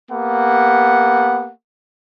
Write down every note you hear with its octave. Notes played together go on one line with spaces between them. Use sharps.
A#3 B3 G4 F#5